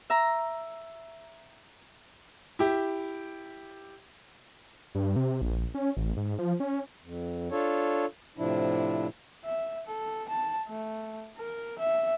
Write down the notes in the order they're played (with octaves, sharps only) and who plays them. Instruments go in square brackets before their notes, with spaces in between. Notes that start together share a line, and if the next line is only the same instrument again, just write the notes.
[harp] E5 A#5
[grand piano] E4 G4
[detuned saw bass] G2
C3
A#1
C#4
A1
G#2
F3
C#4
[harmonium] F2
D4 F4 A4 C#5
A2 C3 F3 D4 E4
[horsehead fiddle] E5
A4
A5
A3
A#4
E5